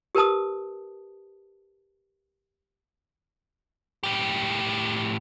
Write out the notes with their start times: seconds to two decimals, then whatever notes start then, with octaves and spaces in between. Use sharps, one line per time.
0.15 G4 A#4 B4 A5 D#6
4.03 A2 G4